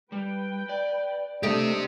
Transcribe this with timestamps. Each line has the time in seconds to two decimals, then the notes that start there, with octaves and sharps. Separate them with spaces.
0.12 G3 B4 G5
0.69 D5
1.43 A3 D4 D#4 G4 C5 D#5